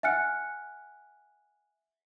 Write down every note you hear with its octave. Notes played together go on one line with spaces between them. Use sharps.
E5 F#5 G#5 F6 F#6 C#7